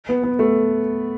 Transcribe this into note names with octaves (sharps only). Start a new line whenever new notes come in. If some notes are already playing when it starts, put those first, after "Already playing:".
B3
B3
A3